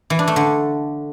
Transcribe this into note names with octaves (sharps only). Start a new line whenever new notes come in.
E3
D4
A3
D3